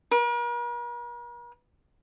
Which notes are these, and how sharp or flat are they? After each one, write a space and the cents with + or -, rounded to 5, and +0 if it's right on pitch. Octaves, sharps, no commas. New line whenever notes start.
A#4 +45